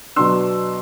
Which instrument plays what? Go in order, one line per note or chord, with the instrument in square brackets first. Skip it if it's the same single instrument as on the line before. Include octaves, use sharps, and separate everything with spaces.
[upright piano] B2 F#3 B3 D4 C6 E6